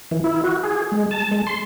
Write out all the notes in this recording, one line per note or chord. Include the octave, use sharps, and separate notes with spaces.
E3
E4
F#4
G#4
G#3
A5
G#3
C6